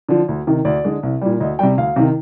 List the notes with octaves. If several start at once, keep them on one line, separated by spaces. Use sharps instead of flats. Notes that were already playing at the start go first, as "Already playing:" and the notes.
D3 F3
D2
C3 D#3
D2 D5
D3 G#3
C2
A#2 G3
D2 D#5
C3 G3 G5
D2 F5
C3 D#3